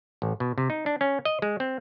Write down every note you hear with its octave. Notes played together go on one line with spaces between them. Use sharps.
A1
B2
C3
D#4
D4
C#4
D#5
G#3
C4